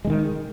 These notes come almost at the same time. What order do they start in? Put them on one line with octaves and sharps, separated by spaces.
G#3 D3 D#3